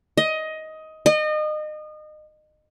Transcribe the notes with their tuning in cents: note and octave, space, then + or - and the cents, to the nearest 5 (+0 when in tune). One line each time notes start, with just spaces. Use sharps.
D#5 +15
D#5 -30